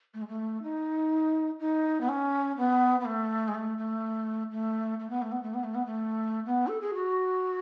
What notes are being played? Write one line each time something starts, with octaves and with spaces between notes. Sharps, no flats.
A3
G#3
A3
D#4
D#4
B3
C#4
B3
B3
A3
G#3
A3
A3
A3
A3
B3
A3
B3
A3
B3
A3
B3
A3
B3
A4
G#4
F#4